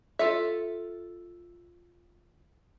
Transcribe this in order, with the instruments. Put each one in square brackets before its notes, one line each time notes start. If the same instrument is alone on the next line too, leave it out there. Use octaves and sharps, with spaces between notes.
[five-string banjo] F4 A4 E5